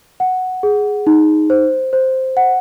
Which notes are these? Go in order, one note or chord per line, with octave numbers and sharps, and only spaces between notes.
F#5
G#4
D#4
C5
C5
F#5